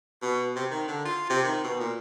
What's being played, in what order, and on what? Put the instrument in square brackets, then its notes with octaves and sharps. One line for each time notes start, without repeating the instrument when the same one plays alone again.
[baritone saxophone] B2
C3
D#3
D3
F4
C3
D#3
B2
A#2